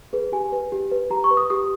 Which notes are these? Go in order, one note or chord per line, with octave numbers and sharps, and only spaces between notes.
G#4 B4
G4 G#5
B4
G4
B4
G4 A#5
C#6
B4
D#6
G4 D#6